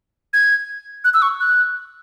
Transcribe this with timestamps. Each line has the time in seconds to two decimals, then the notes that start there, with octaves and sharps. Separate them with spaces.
0.33 G#6
1.04 F#6
1.14 E6
1.22 C#6
1.40 F#6